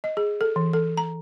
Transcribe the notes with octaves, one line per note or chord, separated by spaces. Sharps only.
D#5
G#4
A4
E3
A4
A#5